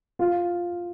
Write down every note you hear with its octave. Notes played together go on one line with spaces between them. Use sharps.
F4